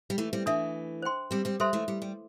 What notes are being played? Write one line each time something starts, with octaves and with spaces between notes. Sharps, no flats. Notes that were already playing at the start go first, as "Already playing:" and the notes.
G3
E3 A3
G3 C4
E3 A3 D4 A4 E5
C5 G5 C6
G3 C4
G3 C4
G3 A4 C5 E5 C6
E3 A3
G3
G3